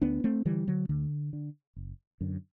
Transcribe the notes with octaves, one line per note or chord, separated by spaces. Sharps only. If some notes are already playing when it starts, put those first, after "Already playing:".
D2 B3 D4
A3 C4
D3 E3 G3
D3 F#3
D2 D3
D3
F#1
F#2 D3